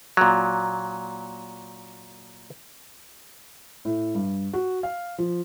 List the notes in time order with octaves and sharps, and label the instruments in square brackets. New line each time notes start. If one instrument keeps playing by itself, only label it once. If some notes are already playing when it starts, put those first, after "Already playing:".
[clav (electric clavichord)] A#2 F#3
[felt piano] A2
G2
F#4
F5
F3